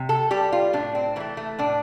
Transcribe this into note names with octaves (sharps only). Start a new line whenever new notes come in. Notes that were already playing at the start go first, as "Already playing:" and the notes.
Already playing: C3
A4
G3 G4
F4
A2 D4
C4
E3 A3 A#3
A3
A2 D4